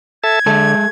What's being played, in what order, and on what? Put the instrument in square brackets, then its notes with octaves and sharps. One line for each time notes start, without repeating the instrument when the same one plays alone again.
[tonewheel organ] A4 E5 A5 [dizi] G#6
[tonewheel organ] D3 [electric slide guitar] G#3 A4